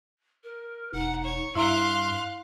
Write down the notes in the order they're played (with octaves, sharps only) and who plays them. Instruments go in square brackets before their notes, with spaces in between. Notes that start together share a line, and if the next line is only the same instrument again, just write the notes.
[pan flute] A#4
[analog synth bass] E1 [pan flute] D#4 [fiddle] F#5
[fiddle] C#5
[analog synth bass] G2 [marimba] E4 E5 A#5 [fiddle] F5 F#6 [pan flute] C6